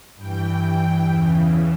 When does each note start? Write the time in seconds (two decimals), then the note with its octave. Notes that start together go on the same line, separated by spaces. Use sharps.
0.16 G2 E3 G5
0.61 G5
1.05 E2 C#3 E3